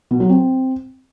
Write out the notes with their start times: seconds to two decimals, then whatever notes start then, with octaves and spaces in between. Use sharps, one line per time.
0.11 B2
0.20 F#3
0.29 C4